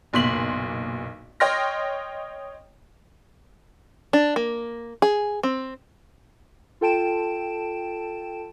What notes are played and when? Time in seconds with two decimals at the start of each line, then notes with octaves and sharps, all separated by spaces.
0.13 F#1 B1 A#2 C6 B6 F#7
1.40 C#5 D#5 G5 C6 F6 A#6
4.13 D4
4.36 A#3
5.02 G#4
5.43 C4
6.81 F4 A4 G5 A5 D7 E7